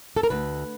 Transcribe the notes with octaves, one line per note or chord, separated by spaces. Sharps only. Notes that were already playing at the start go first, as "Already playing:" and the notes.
A4
A#4
D2 B4